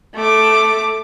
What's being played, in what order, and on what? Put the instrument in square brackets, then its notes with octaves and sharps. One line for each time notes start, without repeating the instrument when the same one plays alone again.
[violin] A3 D6